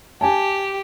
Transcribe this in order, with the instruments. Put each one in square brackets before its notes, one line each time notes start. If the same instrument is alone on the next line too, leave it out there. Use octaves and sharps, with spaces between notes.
[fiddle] G4 [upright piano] G#5 A5